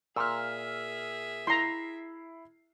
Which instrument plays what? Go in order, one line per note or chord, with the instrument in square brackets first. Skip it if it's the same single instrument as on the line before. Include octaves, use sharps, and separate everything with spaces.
[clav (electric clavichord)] A#2 [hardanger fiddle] G#4 E5 [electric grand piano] E6 F6
[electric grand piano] E4 C7 [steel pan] A#5 C6